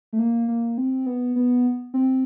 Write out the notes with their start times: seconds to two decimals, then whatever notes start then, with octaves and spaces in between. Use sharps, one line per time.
0.13 A3
0.19 A#3
0.48 A#3
0.78 C4
1.06 B3
1.36 B3
1.94 C4